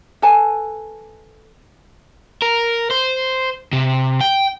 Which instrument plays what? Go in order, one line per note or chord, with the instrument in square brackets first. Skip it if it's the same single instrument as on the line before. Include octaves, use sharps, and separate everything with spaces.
[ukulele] A4 B4 G#5 A5
[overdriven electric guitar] A#4
C5
C3
G5